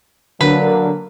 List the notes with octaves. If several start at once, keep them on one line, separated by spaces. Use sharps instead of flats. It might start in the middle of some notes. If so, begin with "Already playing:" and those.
D3 F#3 A#3 D4 A#4 B4